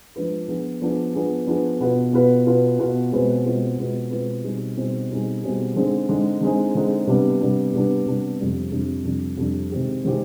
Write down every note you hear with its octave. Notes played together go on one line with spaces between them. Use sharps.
F3 G#3 D4 F4 B4
F3 B3 D4 G#4
F3 B3 D4 G#4
F3 B3 D4 G#4
F3 B3 D4 G#4
B2 B3 F4 B4
B2 B3 F4 B4
B2 B3 F4 B4
B2 B3 F4 B4
B2 G#3 C4 F4 B4
B2 G#3 C4 F4 B4
B2 G#3 C4 F4 B4
B2 G#3 C4 F4 B4
B2 G3 C4 D#4 G#4
B2 G3 C4 D#4 G#4
B2 G3 C4 D#4 G#4
B2 G3 C4 D#4 G#4
D3 G#3 C4 D#4 G#4
D3 G#3 C4 D#4 G#4
D3 G#3 C4 D#4 G#4
D3 G#3 C4 D#4 G#4
C3 G3 B3 D4
C3 G3 B3 D4
C3 G3 B3 D4
C3 G3 B3 D4
F2 C3 G3 D4
F2 C3 G3 D4
F2 C3 G3 D4
F2 C3 G3 D4
C3 D#3 G#3 C4 G4
C3 D#3 G#3 C4 G4